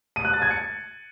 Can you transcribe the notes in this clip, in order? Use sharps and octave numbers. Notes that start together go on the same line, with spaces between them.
D#7
F#6
A6
G#6
C#7